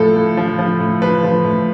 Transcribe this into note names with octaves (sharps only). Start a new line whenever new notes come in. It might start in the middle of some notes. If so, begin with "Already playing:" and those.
Already playing: A2 F3 A4
A2
F3
F3
A2
F3 B4
F3
A2